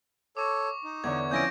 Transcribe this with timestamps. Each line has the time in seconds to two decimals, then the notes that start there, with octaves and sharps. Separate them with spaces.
0.37 A4 C#5 C#6 D6
0.84 D#4
1.04 E2 D3 C#5 G#6
1.31 F3 C4 C#4 E4 D#6 G6 A#6 D7